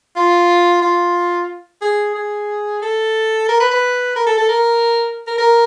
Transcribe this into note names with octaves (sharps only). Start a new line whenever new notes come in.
F4
F4
G#4
G#4
A4
A#4
B4
B4
A#4
A4
A4
A#4
A#4
A#4